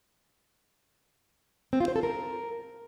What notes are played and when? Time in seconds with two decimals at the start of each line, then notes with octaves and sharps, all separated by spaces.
1.73 C4
1.80 F4
1.88 C5
1.96 A4
2.03 A#4